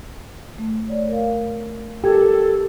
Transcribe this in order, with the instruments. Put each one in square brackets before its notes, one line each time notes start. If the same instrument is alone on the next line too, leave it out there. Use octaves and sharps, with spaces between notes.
[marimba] A3
C#5 D5
A#4 D5 F5
[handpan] G4 [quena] A4 [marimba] A#4 G#6